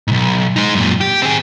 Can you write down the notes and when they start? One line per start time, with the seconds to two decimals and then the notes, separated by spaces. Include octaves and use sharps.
0.07 B1 G#2
0.56 G#3 D#4
0.75 F#2 A#2
1.01 G4
1.22 C4 G#4